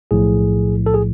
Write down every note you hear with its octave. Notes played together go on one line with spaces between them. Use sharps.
B1 A2 F3 G#4
A4
G#4